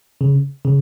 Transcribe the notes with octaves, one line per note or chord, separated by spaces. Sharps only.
C#3
C#3